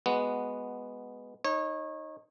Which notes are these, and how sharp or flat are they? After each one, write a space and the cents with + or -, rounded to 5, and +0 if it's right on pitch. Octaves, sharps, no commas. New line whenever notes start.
G#3 +0 B3 +0 F#4 -5
D#4 +0 C#5 -30